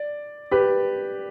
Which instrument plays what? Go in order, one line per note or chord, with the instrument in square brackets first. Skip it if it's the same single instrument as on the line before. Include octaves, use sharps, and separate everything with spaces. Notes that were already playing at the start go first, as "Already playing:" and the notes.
Already playing: [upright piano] D5
G4 B4